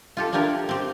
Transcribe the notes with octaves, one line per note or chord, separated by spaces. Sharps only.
F4 G4 A4
D4 E4 F4 G4 A#4
C4 G4